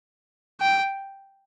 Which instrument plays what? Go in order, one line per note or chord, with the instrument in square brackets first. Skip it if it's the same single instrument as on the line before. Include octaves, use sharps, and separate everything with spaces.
[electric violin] G5